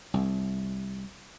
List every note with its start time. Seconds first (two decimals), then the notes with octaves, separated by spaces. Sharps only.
0.14 C2